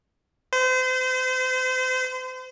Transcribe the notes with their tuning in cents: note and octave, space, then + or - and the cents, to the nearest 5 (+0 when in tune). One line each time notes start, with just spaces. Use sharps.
C5 -35